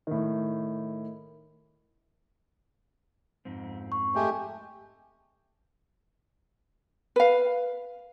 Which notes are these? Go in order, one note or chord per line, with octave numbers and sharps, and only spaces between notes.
A2 D#3
F2 G#2 C4
C#6
G#3 A3 G4
B4 F5